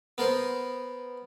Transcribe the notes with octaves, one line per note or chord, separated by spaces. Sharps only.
B3 A#4 C5